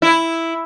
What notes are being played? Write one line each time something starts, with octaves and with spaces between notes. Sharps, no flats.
E4